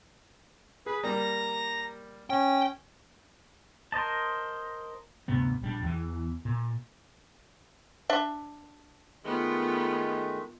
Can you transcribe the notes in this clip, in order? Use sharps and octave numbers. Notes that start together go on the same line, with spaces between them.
G#4 B4
G3 A#3 A#5
C#4 G5
A#4 C5 D#5 A5
D2 G2 C3 B3
A#1 G3 D4
E2 E3
A#2
D4 E5
D#3 G#3 A3 B3 F4